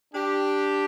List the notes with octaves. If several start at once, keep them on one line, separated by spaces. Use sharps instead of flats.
D4 G4